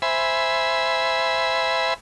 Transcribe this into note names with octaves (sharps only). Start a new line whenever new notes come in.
C5 E5 G#5 B5